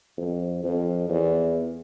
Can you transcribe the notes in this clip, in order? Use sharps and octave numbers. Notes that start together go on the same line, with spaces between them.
F2
F2
E2